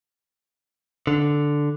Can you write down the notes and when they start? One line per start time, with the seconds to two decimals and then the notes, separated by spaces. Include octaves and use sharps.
1.07 D3